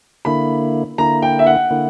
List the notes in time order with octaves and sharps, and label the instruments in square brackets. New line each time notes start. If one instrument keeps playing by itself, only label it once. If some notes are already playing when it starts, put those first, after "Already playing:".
[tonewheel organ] D3 A#3 E4 [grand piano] B5
[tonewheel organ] D3 A#3 E4 [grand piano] A#5
[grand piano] G5
E5
F#5
[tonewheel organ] D3 A#3 E4